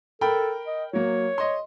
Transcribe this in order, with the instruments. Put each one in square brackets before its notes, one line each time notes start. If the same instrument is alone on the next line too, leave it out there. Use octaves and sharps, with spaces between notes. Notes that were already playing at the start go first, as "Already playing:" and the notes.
[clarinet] A4 [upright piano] A#4 G5 B5
[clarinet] D#5
[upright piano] F#3 A#3 [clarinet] C#5
[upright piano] D#5 C6